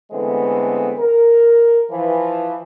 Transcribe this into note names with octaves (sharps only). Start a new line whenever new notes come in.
D3 E3 G#3 A3 B3 C4
A#4
E3 F3